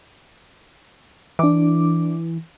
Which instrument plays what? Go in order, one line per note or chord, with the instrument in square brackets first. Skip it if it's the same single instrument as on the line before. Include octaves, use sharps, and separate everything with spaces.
[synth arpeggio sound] E3 [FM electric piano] D4 D6